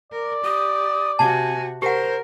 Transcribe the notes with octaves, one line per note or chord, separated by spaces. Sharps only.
A#4 D5
G4 D#6
C3 F#4 G#5 A5
G4 A#4 C5 F#5